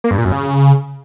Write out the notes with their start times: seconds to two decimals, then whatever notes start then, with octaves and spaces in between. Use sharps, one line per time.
0.04 A#3
0.11 G2
0.18 A#2
0.25 F#2
0.32 C#3